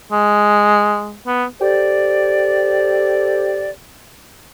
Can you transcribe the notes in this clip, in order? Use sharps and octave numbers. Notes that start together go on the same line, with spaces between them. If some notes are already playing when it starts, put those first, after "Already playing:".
G#3
B3
G4 A4 C5 D5